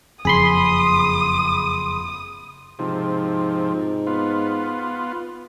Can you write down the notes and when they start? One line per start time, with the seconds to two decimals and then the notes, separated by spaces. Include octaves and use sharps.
0.25 F#1 F2 G#4 B5 C6 D#6
2.79 G#2 C3 F3
4.07 B3 F4